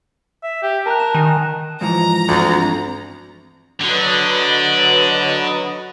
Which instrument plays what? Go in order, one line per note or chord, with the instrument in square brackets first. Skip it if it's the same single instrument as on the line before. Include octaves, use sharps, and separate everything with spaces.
[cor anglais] E5
G4
[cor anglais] A#4 [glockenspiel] A5 A#5 F#6
[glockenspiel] A5 E7
[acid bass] D#3 [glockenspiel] G#5
[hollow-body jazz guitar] G#2 E3 F3 [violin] A#5
[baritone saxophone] D2 [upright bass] G2 C4
[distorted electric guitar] D3 [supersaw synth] F#3 B4 D#5